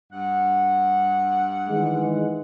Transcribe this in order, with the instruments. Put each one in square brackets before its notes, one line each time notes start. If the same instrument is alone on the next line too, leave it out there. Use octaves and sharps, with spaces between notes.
[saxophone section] G2 F#5
[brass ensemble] D#3 E3 G#3